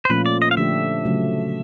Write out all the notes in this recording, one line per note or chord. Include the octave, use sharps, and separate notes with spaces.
C5
A#2 F3 A3 C#4 F4 B4
D5
D#5
F5
D3 F3 A3 D4 G4 E5
C#3 F#3 A3